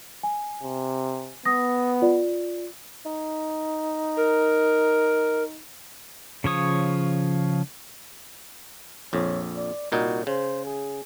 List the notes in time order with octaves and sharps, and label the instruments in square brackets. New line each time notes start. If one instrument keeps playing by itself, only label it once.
[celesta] G#5
[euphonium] C3
[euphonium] B3 [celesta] D#6 A#6
[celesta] F4 D5
[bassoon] D#4
[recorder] A#4
[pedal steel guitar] C#3 F3 C#5 D#6
[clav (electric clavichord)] A#1 F2 [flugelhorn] C#5
[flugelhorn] D5
[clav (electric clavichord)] C2 A#2 D#4 [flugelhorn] F#4
[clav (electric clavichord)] C#3 [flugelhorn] C5
[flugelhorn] G#4